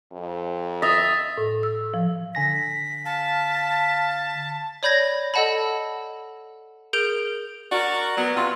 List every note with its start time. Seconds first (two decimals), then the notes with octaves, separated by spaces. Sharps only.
0.12 F2
0.82 D#5 E5 D#6 A6 A#6
1.38 A2
1.63 E6
1.94 F3
2.35 D3 G#5 A#6 B6
3.05 F5 A5
4.83 C#5 D5 B5 G6 G#6 A#6
5.34 A4 D#5 F#5 A5 B5
6.93 G#4 A#4 G6 D7 F7
7.72 F#4 A#4 D5
8.18 F#3 B3
8.37 C3 F4